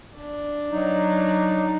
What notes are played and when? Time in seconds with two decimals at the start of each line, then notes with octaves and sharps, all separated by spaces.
0.18 D4
0.71 F#3 D#4